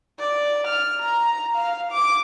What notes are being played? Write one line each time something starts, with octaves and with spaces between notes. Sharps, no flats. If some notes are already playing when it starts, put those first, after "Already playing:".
D5
F6
A#5
F5
D6